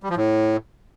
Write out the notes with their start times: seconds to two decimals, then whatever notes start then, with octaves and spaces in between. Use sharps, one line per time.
0.03 G3
0.10 F3
0.17 A2